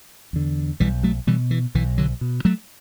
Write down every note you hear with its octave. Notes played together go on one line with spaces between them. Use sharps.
E2 D3
B1 E3 G3
F#3 A3
B2 E3 G3
E3
B1 E3
D3 F#3
B2
F#3 A3